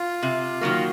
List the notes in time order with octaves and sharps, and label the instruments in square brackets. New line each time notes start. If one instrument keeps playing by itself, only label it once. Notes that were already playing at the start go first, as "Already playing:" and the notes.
Already playing: [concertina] F4
[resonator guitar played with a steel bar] C3
D#3 F#3 A#3